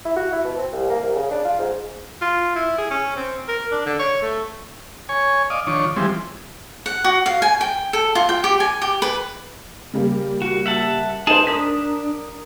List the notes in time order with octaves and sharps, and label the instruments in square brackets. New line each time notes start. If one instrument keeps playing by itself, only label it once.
[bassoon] E4
F#4
E4
B2
C4
C2
A#3
C2
C#3
D4
F4
G#2
[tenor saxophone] F4
E4
G#4
C#4
C4
A#4
D4
D3
C#5
A3
[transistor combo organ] C#5 G#5
D5 D#5 F5
D#3 F3 D4 C#5
E3 F3 G3 G#3 C4
[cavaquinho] F#5
F#4
F5
G#5
G5
A4
F4
G5
G4
G#5
G4
B4
[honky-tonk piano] C#3 G3 A#3
[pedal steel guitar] F#4
E5 F#5 A5
[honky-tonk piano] D#4 B4 C5 [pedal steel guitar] G#4 A5
[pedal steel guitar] D4 [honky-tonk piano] A#4 D#6 B6